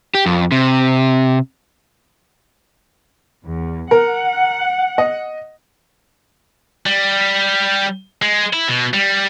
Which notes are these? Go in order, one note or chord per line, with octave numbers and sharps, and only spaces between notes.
G4
F2
C3
E2
A#4 F#5
D#5
G3
G#3
E4
B2
G3